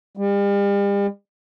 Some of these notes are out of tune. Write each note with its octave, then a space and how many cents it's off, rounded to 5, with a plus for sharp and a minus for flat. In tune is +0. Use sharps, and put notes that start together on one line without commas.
G3 +40